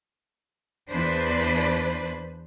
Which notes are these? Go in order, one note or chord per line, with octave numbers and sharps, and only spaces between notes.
E2 D4 B4 C5